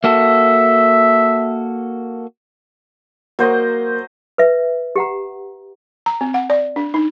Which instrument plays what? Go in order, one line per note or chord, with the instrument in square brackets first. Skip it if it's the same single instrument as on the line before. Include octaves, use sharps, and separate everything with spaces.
[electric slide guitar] A#3 F#4 A4 [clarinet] E5
[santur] F#3 C5 D#5 [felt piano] A#3
[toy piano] B4 E5
G4 F#5 A#5
[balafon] A#5
C4
F#5
D5
D4
D#4